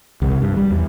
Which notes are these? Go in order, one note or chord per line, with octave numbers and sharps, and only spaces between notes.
C2
G2
G3
E2